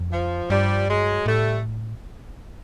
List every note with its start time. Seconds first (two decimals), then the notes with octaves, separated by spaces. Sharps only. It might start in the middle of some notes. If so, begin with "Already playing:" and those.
Already playing: F2
0.11 F3
0.50 G2 F3 G3
0.88 F#3 G#3
1.26 A2 G3 A3